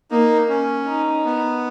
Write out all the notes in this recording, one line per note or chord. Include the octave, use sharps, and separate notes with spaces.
A#3 D#4
C#4
D#4
B3